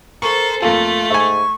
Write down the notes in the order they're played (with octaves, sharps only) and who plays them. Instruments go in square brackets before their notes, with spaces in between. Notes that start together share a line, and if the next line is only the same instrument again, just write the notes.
[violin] A4 C5 [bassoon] A#4 [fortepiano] C#6
[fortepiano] F2 A#3 A4 [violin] A3 [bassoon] F4
[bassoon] G#2 [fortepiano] E5 G#5 [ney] C#6